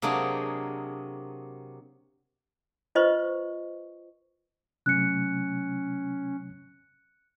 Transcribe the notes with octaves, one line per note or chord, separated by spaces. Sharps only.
C3 F#3 A#3 D4 G#4
F4 B4 C5 D#5 C#6
C3 F#3 A3 C#4 F#6 C#7